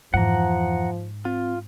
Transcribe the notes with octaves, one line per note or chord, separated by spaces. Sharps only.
F2 G#2 E3 F3 F#5 A#5
C4 F4